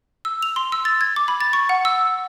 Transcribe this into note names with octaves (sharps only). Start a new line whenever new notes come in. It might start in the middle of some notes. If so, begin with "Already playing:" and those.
E6
F7
C6
E6
A6
G#6
D6
B5
A6
C#6
F#5
E6